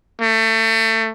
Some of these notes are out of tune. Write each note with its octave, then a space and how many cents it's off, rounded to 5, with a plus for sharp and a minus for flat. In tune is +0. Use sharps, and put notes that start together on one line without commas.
A3 +25